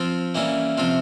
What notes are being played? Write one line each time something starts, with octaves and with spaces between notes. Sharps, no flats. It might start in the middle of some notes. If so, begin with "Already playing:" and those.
Already playing: F3 C4 F4
E3 G3 A#3 C#4 E4
C3 F3 C4 F4